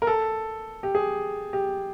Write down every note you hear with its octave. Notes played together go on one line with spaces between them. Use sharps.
A#4
A4
G4
G#4
G4